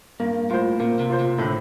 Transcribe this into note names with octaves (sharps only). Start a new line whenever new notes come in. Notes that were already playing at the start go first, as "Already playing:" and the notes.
G2 A#3
A2 F4 C5
A#2 A#3
C3
F4 C5
C3
A2 D3